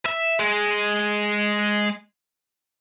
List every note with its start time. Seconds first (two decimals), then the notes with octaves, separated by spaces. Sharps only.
0.06 E5
0.39 G#3